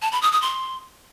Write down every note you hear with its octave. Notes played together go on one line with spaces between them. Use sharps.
A5
B5
D#6
D#6
C6